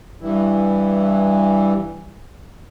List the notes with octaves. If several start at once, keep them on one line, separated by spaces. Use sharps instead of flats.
G2 E3